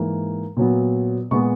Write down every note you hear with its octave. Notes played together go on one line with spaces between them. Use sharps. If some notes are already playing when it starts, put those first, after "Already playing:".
Already playing: G#2 E3 A#3
A#2 F#3 B3
A#2 G#3 B3 C#6